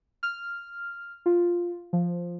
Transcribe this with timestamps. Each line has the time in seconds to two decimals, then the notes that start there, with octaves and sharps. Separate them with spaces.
0.23 F6
1.26 F4
1.93 F3